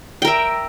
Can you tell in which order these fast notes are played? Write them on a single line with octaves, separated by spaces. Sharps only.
G5 A#4 E5